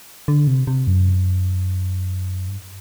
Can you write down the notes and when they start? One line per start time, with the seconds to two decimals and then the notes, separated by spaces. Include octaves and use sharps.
0.28 D3
0.47 C3
0.67 C3
0.87 F#2
2.48 G2